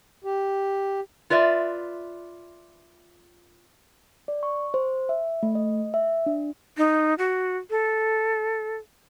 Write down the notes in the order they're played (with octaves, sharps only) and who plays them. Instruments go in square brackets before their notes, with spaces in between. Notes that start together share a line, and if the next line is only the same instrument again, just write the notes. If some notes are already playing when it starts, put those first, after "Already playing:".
[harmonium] G4
[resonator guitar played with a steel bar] F4 B4 D5 E5
[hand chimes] D5
C#6
C5
E5
A3
D#5
E5
D4
[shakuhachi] D#4
F#4
A4